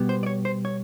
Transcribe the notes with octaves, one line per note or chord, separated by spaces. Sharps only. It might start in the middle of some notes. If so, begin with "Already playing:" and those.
Already playing: B2 G3 B3
C5
D5
C#5
C5
C#5